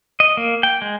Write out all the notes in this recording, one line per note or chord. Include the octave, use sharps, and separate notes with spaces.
D#5
A#3
G5
G#3